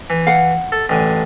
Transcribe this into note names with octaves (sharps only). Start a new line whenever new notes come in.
E3
F5 F#5
A4
A1 D3 G#5